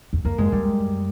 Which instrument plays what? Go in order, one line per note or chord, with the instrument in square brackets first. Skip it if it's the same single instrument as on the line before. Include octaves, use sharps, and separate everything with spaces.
[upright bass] E2
[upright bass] F2 [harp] A#3
[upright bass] F#2 [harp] G#3
[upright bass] F#2 [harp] G3